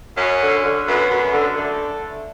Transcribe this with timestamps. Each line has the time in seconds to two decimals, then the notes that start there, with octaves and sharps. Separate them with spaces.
0.17 F#2 C#4
0.40 D3
0.63 D3
0.86 F#2 B3
1.09 F#2
1.32 D3
1.54 D3 A3